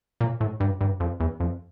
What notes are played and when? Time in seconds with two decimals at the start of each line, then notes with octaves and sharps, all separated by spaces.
0.21 A#2
0.41 A2
0.60 G2
0.81 G2
1.00 F2
1.20 E2
1.40 F2